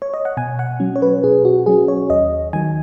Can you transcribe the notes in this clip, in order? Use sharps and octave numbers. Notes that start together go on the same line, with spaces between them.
C#5
D#5
F#5
B2 G#5
F#5
F#3 C#4
C#5
B4
B2 G#4
F#4
F#3 C#4 G#4
C#5
D#2 D#5
D#3 F#3 G#5